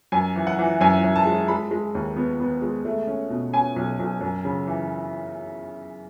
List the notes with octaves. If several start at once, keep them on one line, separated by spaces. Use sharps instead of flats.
F#2 G#5
E3
F#5
E3
F#2 G#5
F#2
A5
G#3
G#3 B5
G#3
D#2
B3
B3
G#3
A3
C#4
B2
C#4 G#5
B1
B1
F#2
C#3
E3